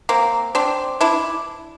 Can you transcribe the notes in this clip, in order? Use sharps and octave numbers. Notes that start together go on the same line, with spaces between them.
A#3 C4
C4 D4
D4 E4